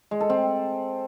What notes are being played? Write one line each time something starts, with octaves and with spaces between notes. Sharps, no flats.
G#3
A4
C4